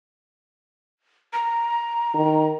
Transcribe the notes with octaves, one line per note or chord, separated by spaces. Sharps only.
A#5
D#3